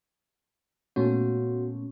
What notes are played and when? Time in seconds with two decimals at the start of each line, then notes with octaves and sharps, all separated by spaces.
0.96 A#2 A3 B3 C#4 F#4